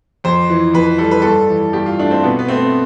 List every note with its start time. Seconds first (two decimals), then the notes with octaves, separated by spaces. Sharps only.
0.24 F2 C5
0.50 E3
0.74 F2 B4
0.98 G3 A4
1.11 B4
1.22 G2 A4
1.49 E3
1.73 G2 G4
1.86 F4
1.99 A3 D4
2.11 C4
2.23 B2 B3
2.39 B3
2.48 A3 C4